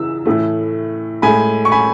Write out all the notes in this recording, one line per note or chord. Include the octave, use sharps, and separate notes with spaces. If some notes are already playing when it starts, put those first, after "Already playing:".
Already playing: C#3 E3 E6
A2 E3 A3
A2 G#3 G#5 B5
C#6
G#5 B5